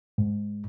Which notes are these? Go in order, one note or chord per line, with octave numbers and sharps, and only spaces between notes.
G#2